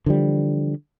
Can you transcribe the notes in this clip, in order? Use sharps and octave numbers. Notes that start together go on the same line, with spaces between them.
D3 E3 F3 G3